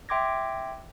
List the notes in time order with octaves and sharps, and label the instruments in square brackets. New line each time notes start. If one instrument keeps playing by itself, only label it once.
[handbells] E5 G5 C6 D6 G#6 A#6